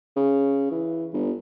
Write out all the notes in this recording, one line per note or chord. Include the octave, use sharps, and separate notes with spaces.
C#3
E3
G1